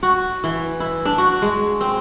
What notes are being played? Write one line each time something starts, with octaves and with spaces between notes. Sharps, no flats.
F#4
E3
E4
D4
F#4
G#3
C4